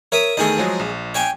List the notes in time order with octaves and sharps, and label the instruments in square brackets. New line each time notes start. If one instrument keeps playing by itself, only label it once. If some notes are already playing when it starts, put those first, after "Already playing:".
[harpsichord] A#4 E5 D#6 [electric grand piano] C#5
[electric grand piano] E2 D#3 A3 [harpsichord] G#4 D#5
[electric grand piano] F3 F#3 G#3
A#1
[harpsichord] C#5 G5 G#5